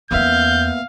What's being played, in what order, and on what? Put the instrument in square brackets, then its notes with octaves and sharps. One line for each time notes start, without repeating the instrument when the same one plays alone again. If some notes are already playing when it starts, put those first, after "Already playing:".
[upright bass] E2 C#4 [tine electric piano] A#3 B3 E5 [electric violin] F5 [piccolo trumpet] G6